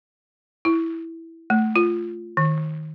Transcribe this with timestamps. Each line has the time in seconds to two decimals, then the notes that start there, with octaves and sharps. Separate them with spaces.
0.65 E4
1.50 A3
1.76 F4
2.37 D#3